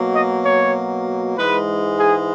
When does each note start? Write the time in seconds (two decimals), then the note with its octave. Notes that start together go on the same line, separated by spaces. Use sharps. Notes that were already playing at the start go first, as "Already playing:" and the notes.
Already playing: B2 F#3 A#3
0.13 D#5
0.44 C#5
1.37 G#2 E3 G#3 B4
1.99 G#4